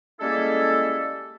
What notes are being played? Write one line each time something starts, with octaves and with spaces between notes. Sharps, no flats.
G3 G#3 A#3 C#4 E4 A4